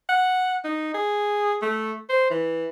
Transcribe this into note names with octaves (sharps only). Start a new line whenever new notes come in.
F#5
D#4
G#4
A3
C5
E3